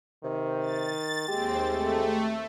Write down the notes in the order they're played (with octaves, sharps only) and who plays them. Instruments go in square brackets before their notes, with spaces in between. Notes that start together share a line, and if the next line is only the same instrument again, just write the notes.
[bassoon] C3 [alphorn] D#3
[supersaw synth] A6
[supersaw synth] D#2 C4 [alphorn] G#3 [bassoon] G4
[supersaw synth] A3